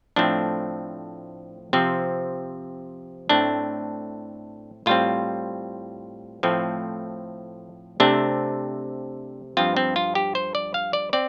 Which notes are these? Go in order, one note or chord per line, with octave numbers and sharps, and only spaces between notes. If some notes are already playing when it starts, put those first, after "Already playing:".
A2 F3 A3 C4 D4
C3 F3 C4
A2 A3 C4 D4
A2 G3 C4 F4
A2 F3 A3 C4
C3 A3 C4 D4
G2 F3 C4 F4
C4
F4
G4
C5
D5
F5
D5
C4 D5